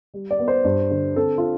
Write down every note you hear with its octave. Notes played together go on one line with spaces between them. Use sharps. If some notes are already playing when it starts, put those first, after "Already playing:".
G3
D5
B3
C5
G2
D3
C4 A4
F4